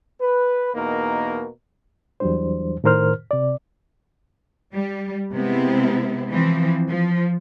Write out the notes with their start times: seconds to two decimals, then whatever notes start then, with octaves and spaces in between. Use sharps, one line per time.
0.21 B4
0.74 E2 B2 A#3 D#4 A#4
2.20 E2 E3 F#3 G3 D4 C5
2.84 A2 D#3 A#4 C5 F6
3.31 C3 D5
4.74 G3
5.34 C3 G#3 B3 C4 E4
6.31 E3 F3 C4
6.89 F3